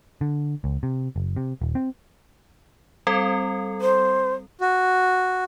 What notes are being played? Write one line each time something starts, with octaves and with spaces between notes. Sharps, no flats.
D3
C#2
C3
F#1
C3
D#1
C4
G3 C4 A4
C5
F#4